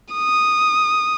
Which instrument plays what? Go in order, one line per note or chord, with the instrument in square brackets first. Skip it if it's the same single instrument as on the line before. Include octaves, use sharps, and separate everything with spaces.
[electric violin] D#6